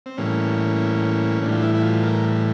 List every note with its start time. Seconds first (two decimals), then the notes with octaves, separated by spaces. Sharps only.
0.06 C4
0.17 A2 E3 G3 A#3 C#4
1.41 A2 E3 G3 D4
1.52 F4
1.62 E4
1.75 E4
1.83 F4
2.03 A#4